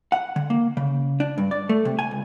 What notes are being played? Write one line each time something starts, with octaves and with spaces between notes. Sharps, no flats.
F#5
D3
A#3
C#3
D4
G2
D5
A3
C3
G#5
C#2